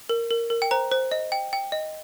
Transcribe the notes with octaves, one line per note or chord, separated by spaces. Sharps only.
A#4
A#4
A#4
G5
C5 A#5
C5
D#5
G5
G5
D#5